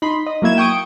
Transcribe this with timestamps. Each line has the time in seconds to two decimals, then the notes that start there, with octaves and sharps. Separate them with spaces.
0.02 D#4 B5 C6
0.26 D#5
0.42 F#3 A#3 E4 G#6 E7
0.58 G5 C#6 D#6 D7